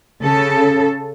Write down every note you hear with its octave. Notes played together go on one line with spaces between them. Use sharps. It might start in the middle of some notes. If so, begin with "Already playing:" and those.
C#3 A4